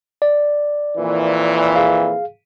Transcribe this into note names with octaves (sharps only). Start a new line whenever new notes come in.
D5
F2 A#2 E3
G#4 F5